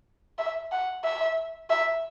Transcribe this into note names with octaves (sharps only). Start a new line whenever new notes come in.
E5
F#5
E5
E5